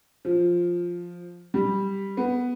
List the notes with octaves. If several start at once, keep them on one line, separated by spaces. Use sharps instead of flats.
F3
G3
B3